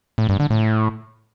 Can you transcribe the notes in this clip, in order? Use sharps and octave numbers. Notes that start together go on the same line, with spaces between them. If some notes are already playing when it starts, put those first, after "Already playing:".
A2
G2
D3
A2